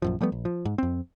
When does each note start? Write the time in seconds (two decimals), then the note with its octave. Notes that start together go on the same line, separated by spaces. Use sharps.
0.02 A#1 F#2 F3
0.21 F3 G3 A3 B3
0.32 A#1
0.45 F3
0.65 G#2
0.78 F2 C4